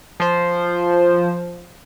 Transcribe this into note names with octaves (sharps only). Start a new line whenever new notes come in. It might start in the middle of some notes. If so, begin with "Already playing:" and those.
F3 C5